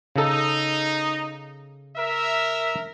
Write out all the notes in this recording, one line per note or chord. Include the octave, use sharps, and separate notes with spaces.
C#3 D#4 A4
A#4 E5